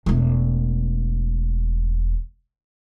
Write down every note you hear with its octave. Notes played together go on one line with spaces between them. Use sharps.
E1 A3